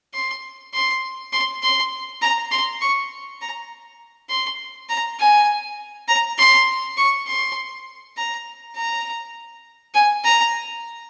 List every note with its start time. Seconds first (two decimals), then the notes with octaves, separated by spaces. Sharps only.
0.14 C6
0.74 C6
1.33 C6
1.63 C6
2.22 A#5
2.51 C6
2.81 C#6
3.41 A#5
4.29 C6
4.89 A#5
5.19 G#5
6.08 A#5
6.38 C6
6.97 C#6
7.27 C6
8.17 A#5
8.76 A#5
9.94 G#5
10.24 A#5